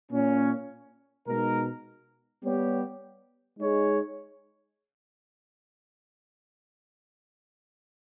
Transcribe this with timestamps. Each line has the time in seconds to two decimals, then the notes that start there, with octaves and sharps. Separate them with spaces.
0.11 A#2 A#3 C#4
1.27 B2 G#3 D#4 A#4
2.43 G3 B3 G4 C#5
3.59 G#3 D#4 G#4 C#5